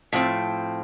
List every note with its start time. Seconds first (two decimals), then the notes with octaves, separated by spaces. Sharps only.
0.13 A2 F3 C4